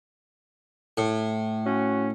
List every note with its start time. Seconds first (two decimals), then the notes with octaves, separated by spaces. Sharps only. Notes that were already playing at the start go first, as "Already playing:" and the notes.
0.98 A2
1.65 C#4 F#4